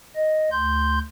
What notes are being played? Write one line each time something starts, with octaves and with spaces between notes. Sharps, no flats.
D#5
D2 C6 G6